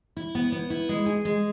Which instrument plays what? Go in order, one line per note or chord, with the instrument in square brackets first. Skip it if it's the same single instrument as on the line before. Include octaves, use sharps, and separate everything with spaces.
[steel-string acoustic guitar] E4
B3
B3
E4
G#3
G#4
G#3